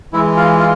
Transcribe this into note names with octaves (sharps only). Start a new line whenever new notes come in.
E3 G#3 E4
F4
F4